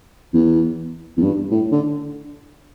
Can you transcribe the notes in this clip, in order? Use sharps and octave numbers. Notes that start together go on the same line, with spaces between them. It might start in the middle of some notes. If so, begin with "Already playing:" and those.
E2
E2
G2
A2
D3